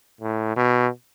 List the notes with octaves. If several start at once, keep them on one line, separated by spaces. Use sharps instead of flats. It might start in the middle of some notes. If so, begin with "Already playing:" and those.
A2
B2